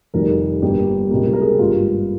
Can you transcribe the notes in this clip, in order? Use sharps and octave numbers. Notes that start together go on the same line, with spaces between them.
F1 F2 D#3 G3 A#4
G1 G2 G3 A#3 G4
C#2 C3 G3 A#3
A#4
G#4
G4
G#1 G2 G3 A#3 F4